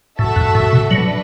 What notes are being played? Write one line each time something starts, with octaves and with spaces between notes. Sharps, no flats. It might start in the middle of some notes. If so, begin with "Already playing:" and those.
A2 A3 F#4 A4 E5
F#2
A2
B2
F#3 D4 B4